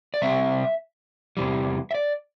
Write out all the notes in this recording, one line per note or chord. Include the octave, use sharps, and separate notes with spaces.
D5
C3 G3 C4 E5
E2 C3 E3 G3
E5
D5